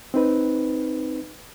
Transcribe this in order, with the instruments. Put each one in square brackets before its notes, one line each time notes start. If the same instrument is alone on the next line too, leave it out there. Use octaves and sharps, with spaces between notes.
[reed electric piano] C4 D#4 B4